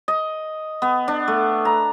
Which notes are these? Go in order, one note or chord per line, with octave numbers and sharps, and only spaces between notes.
D#5
B3
D4
A3
A#5